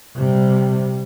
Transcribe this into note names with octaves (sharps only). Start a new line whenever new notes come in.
C3 G3